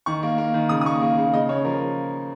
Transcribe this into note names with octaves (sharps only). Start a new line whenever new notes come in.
D#3 C#6
A#3
A#3
D#3
C#3 D#6
D#6
A#3 C#6
A#3
C#3
C#3 D#5
C#3 C#5
F3 A#4